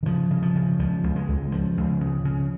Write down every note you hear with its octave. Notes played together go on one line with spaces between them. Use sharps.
D#3
C#3 F3
C#3
F3
C#3
C#2 F3
C#2
G#3
C#2
C#2 F3
C#2
C#3
C#3